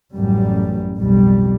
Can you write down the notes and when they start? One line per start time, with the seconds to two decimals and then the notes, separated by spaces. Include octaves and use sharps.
0.15 A1 F#2 G3
1.00 B1 F2 G3